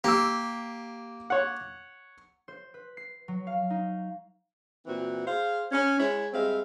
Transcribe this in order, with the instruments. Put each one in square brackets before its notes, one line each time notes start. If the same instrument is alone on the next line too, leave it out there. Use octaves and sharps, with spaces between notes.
[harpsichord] A#3 [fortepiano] G4 E6
[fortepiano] C#5 F#5
[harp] C5
B4
C7
F#3
F5
D#4
[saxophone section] A#2 E3 C4 F#4
G#4 C5 F5
C#4
G#3 E4 C#5
G3 G#3 C4 E5 F5